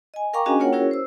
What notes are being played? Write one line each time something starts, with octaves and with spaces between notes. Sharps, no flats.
D#5 G#5
A#4 F5 G5 A#5 C#6 D6
C#4 D4 F#4 G#4 D#5 G#5
A#3 F4 A#4 C#5 F#5 G5
C#4 E4 F#4 G#4 A#4 C#5
C5 E6